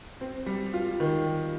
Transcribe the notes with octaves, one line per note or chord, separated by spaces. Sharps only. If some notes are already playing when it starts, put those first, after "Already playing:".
C4
G3
F4
D#3